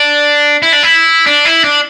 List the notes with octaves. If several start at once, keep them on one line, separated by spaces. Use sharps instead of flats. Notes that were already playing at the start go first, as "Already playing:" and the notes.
Already playing: D4
E4
D4
E4
D4
E4
D4